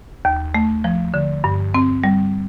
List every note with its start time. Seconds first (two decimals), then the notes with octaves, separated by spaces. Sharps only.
0.25 D#2
0.55 A3
0.84 F3
1.14 D3
1.44 G2
1.74 C4
2.04 G3